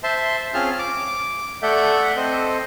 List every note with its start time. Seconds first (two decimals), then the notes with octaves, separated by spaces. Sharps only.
0.03 C5 E5 A5 C6
0.54 C4 C#4 F4 G#4 A5 F6
0.79 D6
1.63 A3 A4 D5 E5 F#5 G6
2.16 C4 A4 C5 D#5